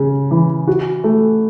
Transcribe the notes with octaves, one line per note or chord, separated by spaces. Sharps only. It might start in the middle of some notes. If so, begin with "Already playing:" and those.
Already playing: C#3 C#4
E3
F#4
A3